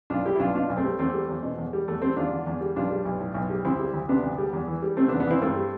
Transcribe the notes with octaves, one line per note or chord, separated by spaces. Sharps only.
B1 D4 F4
G3 E4 G4
E4
B1 D4 F4
B2 D4 F4
B1
A3 C4
G3
E2 A3 C4
G3
E2
B2
E2
G3
E2 A3
G3 A3 C4
E2 D4 F4
D3
E2
G3
B1 D4 F4
G3
B1
A2
B1
G3
D2 C4 E4
G3
D2
C3 B3 D4
D2
G3
E2
E3
G3
C3 A3 C4
B3 D4
E2
B3 D4
E3 C4 E4
G2 A3 C4
G3